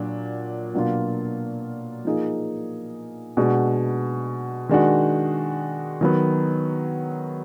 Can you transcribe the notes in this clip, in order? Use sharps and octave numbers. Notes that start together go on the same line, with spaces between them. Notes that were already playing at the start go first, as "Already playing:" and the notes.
Already playing: A#2 F#3 D4
B2 F#3 A#3 D4 F4
F3 A#3 D#4 G#4
B2 G#3 D4 F#4
D#3 G#3 D4 F#4
D#3 F#3 B3